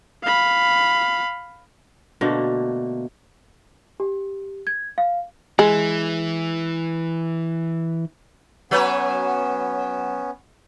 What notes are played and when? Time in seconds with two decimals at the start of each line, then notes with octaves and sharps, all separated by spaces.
0.23 F5 B5
2.21 B2 D3 A3 A#3
4.00 G4
4.67 G#6
4.98 F5
5.59 E3 G#3
8.71 F#3 B3 C#4 B4 C#5